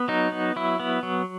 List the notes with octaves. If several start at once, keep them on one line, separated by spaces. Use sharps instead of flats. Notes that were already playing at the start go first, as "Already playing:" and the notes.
Already playing: B3
F#3 D#4
B3
F#3 E4
B3
F#3